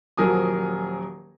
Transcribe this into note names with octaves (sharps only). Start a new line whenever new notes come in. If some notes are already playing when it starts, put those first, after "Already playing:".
D#1 F3 F#3 A#4 G#5 D#6